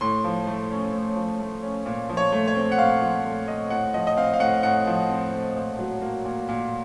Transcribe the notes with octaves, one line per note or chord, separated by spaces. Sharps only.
A2 C6
F3
A3
C#4
A2
F3
A3
C#4
A#2
F3
C#5
A3
C#5
C4
F#5
A#2 F5
F3
A3
C4 D#5
A2 F#5
F3 D#5
D#5
C4 F5
F5
A2 F#5
A2 F#5
F3
C4
A2
A#2
F#3
A#3
A#2
A#2